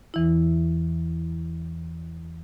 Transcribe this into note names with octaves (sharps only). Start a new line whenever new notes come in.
E2 E3 E4